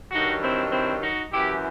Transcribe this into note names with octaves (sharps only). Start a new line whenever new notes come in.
G2 D#3 F#3 D#4 F#4
C4 E4
C4 E4
D#4 F#4
F#2 E3 E4 G4